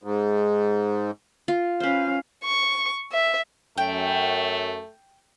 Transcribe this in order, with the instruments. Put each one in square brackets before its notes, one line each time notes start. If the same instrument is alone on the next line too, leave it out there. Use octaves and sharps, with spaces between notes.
[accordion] G#2
[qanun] F4
[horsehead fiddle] C#4 F5 [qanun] B4 C5
[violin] C#6
E5
[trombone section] F#2 [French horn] A3 [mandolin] G5